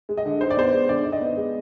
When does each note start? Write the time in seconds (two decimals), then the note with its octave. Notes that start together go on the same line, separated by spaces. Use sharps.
0.09 G#3
0.17 D#5
0.26 D3
0.41 D#4 C5
0.50 D5
0.57 B3 C5
0.73 G#3
0.89 D3 D5
1.04 D#4
1.12 D#5
1.21 B3
1.37 G#3